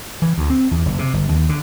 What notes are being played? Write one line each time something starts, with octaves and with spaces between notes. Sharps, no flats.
E3
D2
C4
E2
F#1
C3
G1
D#2
D3